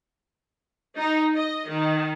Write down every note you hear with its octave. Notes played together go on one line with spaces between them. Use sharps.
D#4
D#5
D#3